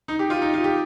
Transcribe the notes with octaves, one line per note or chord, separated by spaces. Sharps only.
D#4
G4
F4
D#4
F4
G4